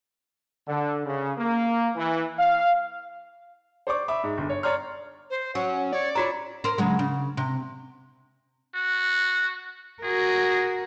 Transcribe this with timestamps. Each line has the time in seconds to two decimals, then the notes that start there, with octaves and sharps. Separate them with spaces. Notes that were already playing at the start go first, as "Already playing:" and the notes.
0.68 D3
1.05 C#3
1.38 A#3
1.96 E3
2.39 F5
3.87 C5 D5 C#6 D6
4.08 E5 B5 D6
4.23 G#2
4.38 G1
4.49 C#5
4.63 C#5 D5 A#5 C6 F6
5.30 C5
5.55 F#3 C#4 F#5
5.93 C#5 D5
6.15 C4 C#4 F4 F#4 C#5 A#5
6.64 A#4 C5
6.78 C#3 F#3 G#3
6.99 C#3
7.37 C3
8.75 F#4
10.03 F#4 G#4 A#4